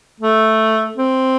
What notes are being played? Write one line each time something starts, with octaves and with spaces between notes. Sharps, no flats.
A3
C4